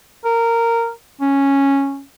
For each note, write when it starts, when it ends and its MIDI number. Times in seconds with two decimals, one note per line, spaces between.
0.25 0.90 70
1.21 2.02 61